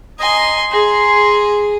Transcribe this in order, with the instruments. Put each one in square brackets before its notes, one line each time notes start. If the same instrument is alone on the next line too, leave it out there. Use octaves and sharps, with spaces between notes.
[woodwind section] D#5 A#5 D#6 [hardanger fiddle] G#5 C6
[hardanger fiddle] G#4 [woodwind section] G#5 A#5 C6